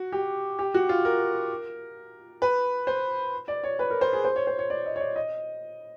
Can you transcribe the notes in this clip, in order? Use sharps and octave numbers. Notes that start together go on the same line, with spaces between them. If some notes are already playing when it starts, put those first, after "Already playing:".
Already playing: F#4
G4
G4
F#4
F4
A#4
B4
C5
D5
C#5
B4
A#4
C5
G#4
C5
C#5
C5
C#5
D5
D#5
C#5
D5
D#5